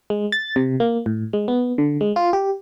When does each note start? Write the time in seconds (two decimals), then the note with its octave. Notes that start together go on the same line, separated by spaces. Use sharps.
0.10 G#3
0.32 A6
0.56 C3
0.80 A#3
1.06 A2
1.33 G#3
1.48 B3
1.78 D3
2.01 G#3
2.16 F4
2.33 G4